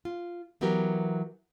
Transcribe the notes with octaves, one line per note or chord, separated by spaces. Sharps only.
F4
E3 F#3 B3 G4 A#4